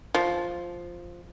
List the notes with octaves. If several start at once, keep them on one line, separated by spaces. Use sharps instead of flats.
F3